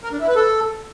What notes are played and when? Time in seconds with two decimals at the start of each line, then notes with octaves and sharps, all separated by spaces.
0.04 A#4
0.12 D4
0.20 E4
0.28 B4
0.36 A4